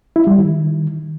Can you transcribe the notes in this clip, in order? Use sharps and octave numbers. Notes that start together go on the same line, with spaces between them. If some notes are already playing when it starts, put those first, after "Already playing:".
E4
G3
D#3